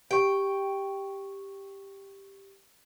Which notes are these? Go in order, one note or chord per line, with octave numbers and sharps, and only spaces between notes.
G4 G5 C#6